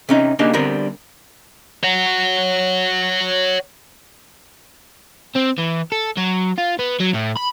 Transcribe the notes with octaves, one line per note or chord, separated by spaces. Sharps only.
C3 C#4 D#4
C#3 A#3 D4 D#4 G4
D3 G3 B3 C4 A#4
C#5 F#5
C4
E3
A4
F#3
F4
B3
F#3
A2
B5